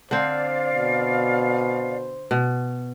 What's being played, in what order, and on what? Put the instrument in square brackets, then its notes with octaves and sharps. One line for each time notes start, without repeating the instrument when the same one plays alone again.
[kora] D3 C4 [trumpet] C5 [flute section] D5 F5
[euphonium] B2
[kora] B2